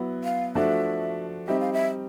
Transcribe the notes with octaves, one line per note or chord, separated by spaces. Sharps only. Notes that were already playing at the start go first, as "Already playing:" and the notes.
Already playing: F#3 B3 E4
F5
F3 A3 D4 F#4 E5
G3 C4 D#4 G4 E5
F5
E5